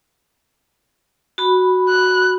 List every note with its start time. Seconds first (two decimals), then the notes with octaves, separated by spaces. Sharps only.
1.38 F#4 B5
1.89 F#6